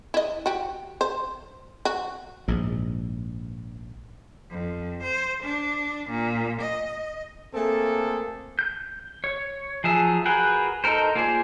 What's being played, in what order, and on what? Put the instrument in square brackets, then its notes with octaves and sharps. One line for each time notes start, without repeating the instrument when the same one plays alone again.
[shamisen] E4 D#5
F#4 G4
C5
F#4
[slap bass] A#1 G#2
[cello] F2
C5
D4
A#2
D#5
[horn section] A3 A#3 C4 G#4 A4
[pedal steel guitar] G6
C#5
F3 F#3 G#4 E5
F#4 G#4 A#4 B4 G5
D#4 A4 A#4 C5
A#3 F4 G#4 C5 D5